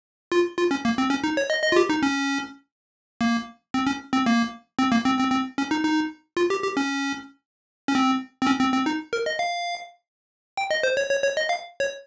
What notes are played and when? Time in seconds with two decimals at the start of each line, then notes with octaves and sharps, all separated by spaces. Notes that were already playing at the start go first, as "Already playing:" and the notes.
0.32 F4
0.58 F4
0.71 C#4
0.85 A#3
0.98 C4
1.10 C#4
1.24 D#4
1.37 C#5
1.50 D#5
1.63 D#5
1.72 F4
1.76 G4
1.89 D#4
2.03 C#4
3.21 A#3
3.74 C4
3.87 C#4
4.13 C4
4.26 A#3
4.79 C4
4.92 A#3
5.05 C4
5.19 C4
5.31 C4
5.58 C#4
5.71 D#4
5.84 D#4
6.37 F4
6.50 G4
6.63 G4
6.77 C#4
7.88 C#4
7.95 C4
8.42 C4
8.47 C#4
8.60 C4
8.73 C4
8.86 D#4
9.13 A#4
9.26 D#5
9.39 F5
10.57 G5
10.71 D#5
10.83 C5
10.97 C#5
11.11 C#5
11.23 C#5
11.37 D#5
11.49 F5
11.80 C#5